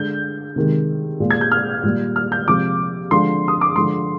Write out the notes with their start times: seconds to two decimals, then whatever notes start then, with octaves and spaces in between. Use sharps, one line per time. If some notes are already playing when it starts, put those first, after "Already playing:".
Already playing: D3 G#3 G6
0.56 C3 D#3 G#3
1.20 A#2 G#3
1.31 G#6
1.41 G6
1.52 F6
1.83 A#2 G3
2.16 F6
2.32 G6
2.48 C3 F3 G#3 D6
3.11 D3 F3 G#3 C6
3.48 D#6
3.61 D6
3.75 D3 F3 G#3 C6